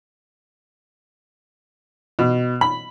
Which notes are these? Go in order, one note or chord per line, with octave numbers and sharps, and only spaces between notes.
B2
B5